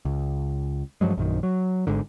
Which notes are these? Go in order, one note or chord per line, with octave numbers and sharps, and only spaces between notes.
C#2
G2 F3 F#3 G#3
A#1 F#2 D#3
F#3
G#1 G#2 D3